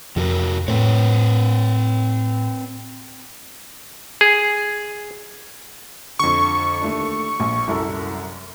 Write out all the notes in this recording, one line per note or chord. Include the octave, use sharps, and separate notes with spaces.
F2 C3 F#4 A#4
A2 C4 B4 C#5
G#4
F2 D3 C#6
D#2 A3 D4
A#1
C2 F#2 A4